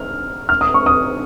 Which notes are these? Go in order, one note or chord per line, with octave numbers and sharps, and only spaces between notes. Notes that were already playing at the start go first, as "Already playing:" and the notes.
Already playing: F6
F6
D#6
C#6
D#6